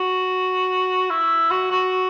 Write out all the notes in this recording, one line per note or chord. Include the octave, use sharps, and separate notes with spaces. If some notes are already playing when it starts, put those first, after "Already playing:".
Already playing: F#4
E4
F#4
F#4